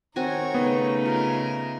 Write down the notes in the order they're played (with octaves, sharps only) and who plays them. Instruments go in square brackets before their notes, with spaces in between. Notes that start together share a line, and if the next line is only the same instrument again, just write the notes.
[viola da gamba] D#3 [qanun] C4 F#4 G#5 [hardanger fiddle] A#4 C#5
[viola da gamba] C#3 A3 D#4 [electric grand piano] B3
[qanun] F4 [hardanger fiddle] A#4